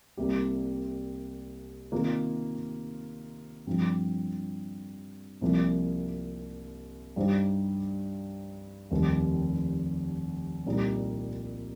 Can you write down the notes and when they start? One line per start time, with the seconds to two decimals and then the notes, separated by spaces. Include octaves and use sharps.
0.17 C2 C3 G3 A#3 G4
1.92 C3 D#3 A#3 F4
3.67 G2 F3 C4
5.41 C2 C3 F3 A#3
7.16 G2 G3 D#4 G4 C5
8.90 F1 D#2 D#3 G3
10.66 C2 A#2 G3 D#4